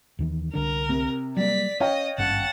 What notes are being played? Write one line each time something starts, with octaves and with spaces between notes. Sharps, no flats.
D#2 D#3 E3
C2 D3 D4 A#4
C3
F#3 G3 A#3 D5 B6
C#4 C#5 D#5 F5 G5
G#1 G2 C#4 F#5 A5